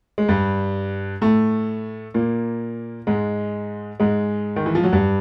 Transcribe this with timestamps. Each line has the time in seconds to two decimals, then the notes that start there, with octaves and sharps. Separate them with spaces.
0.18 G#3
0.29 G2 G3
1.21 A2 A3
2.14 A#2 A#3
3.07 G#2 G#3
4.00 G#2 G#3
4.56 D#3
4.66 E3
4.75 F3
4.83 F#3
4.93 G2 G3